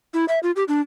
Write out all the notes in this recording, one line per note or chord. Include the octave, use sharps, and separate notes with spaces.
E4
E5
F4
G4
D4